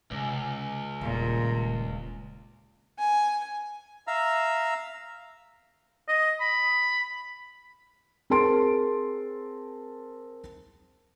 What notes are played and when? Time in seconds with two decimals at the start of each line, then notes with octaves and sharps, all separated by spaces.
0.11 C#2 C3
1.01 D#1 A#2
2.99 G#5
4.07 E5 F5 A#5 E6
6.08 D#5
6.41 B5
8.30 C4 G#4 A#4 A5 C6 D7